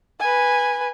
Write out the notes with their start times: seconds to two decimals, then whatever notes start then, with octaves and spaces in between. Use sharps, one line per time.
0.20 B4 G#5